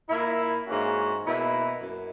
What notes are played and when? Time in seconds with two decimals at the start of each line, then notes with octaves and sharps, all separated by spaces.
0.09 A#2 A#3 E4
0.67 G#2 E3 A#3 C#4 F#4
1.25 B2 A#3 E4
1.82 F#2